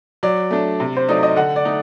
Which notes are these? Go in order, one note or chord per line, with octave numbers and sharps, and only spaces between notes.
F#3 D5
A3 D4
C3
C5
F#3 A3 D#4 D5
D#5
D3 F#5
D5
A3 D#4